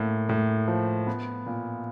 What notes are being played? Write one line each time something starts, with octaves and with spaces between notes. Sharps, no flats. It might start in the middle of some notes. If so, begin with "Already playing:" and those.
Already playing: A2 A#3
A2
F3
B3
A#2